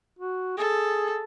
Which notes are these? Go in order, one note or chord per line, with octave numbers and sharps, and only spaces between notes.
F#4
G#4 A4